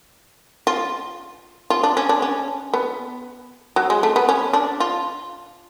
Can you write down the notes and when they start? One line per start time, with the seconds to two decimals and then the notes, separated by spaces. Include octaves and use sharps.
0.67 F4
1.70 F4
1.83 D4
1.97 C#4
2.09 D4
2.22 C#4
2.74 B3
3.76 F#3
3.90 G#3
4.03 A3
4.16 B3
4.29 C#4
4.53 D4
4.80 F4